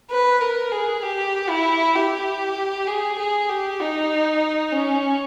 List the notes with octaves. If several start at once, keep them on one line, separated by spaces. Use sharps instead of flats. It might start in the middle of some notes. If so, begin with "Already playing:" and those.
B4
A#4
G#4
G4
E4
G4
G#4
G#4
G4
D#4
C#4